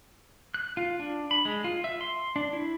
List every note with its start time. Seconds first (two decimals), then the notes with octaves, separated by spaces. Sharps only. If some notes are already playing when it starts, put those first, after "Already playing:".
0.54 F#6
0.77 F4
0.99 D4
1.31 B5
1.45 G#3
1.64 F4
1.84 E5
2.01 C6
2.36 D4
2.53 E4